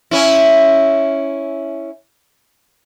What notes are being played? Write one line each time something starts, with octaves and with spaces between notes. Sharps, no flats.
C#4 E4